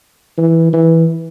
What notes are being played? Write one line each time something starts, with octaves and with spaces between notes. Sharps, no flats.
E3
E3